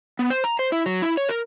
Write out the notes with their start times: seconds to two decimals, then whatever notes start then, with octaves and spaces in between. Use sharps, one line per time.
0.19 B3
0.30 C5
0.44 A#5
0.59 C5
0.72 E4
0.86 F#3
1.02 E4
1.17 C#5
1.29 A#4